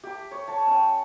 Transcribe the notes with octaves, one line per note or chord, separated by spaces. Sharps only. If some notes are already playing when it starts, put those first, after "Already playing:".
G4 D6
C#5
C#5 A5
C#4 G5